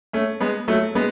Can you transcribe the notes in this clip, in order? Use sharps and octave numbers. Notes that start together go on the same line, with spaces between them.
A3 C#4
G#3 B3
F#3 A3
G#3 B3